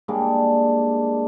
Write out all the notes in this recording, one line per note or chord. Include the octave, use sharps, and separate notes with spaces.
G3 G#3 A#3 D4